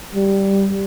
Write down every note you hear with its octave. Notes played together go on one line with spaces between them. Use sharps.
G3